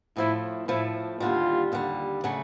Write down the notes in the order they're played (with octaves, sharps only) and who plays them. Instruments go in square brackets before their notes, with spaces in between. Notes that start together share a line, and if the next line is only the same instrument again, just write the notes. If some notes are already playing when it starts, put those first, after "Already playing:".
[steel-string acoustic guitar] A2 F3 A3 [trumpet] E4
[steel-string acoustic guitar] A2 F3 A3 [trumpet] E4
[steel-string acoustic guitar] D#2 D3 G3 [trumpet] F4
[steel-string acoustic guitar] D#2 D3 G3
C#3 F#3 A3